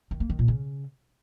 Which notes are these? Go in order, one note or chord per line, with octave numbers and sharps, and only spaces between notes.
D#3
A#3
D#3
A#2
C#3